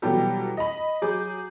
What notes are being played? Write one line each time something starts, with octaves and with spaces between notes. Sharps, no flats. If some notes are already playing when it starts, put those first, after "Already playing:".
B2 E3 F#3 G3 G4 A4
D#5 B5
F#3 G#4 D6 G6